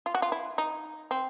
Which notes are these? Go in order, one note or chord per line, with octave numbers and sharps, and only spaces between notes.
F4
F#4
F4
E4
D#4
C4